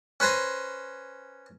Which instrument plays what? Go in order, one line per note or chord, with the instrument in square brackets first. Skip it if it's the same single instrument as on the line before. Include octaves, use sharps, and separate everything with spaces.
[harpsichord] C#4 B4 C5 G#5 A#5